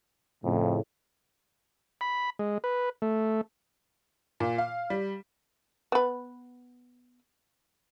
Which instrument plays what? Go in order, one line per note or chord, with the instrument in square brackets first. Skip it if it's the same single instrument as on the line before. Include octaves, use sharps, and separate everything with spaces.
[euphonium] F2 [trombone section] A2 C#3
[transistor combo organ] B5
G#3
B4
A3
[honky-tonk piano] A#2
F5
G3
[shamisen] B3 B4